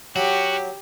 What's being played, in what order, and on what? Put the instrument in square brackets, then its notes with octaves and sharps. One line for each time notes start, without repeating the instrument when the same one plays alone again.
[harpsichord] F#3 [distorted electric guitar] F#4 [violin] G4